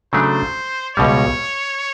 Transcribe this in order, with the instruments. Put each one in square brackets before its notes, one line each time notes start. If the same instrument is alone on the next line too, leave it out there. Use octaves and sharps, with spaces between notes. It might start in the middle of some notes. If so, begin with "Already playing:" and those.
[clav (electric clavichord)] C#3 F#3 A3 D4 [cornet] C5
[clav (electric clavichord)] C#2 B2 G3 [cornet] C#5